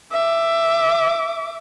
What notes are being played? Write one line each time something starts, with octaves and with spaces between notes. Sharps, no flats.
E5 D6